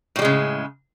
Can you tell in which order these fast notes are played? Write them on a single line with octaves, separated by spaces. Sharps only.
A2 G3 G#3 C#3